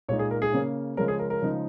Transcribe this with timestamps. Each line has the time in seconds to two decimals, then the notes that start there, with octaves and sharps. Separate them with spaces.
0.09 A#2 G#3 D#4 C#5
0.19 G#4
0.31 A#4
0.42 G#4
0.53 C#3 A#3 C#4
0.97 C#3 F3 G#3 C#4 A#4
1.08 G#4
1.19 A#4
1.30 A#4
1.42 C#3 F3 G#3 D#4